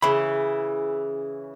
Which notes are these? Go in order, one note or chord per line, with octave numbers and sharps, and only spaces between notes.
C#3 E3 B5